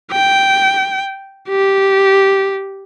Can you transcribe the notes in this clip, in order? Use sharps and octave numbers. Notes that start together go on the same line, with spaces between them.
G5
G4